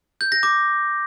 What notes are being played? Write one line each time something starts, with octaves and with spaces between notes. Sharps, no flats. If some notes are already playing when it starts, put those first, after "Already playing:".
G6
A#6
D6